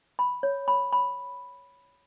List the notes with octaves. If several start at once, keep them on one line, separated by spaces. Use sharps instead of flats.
B5
C#5
B5
B5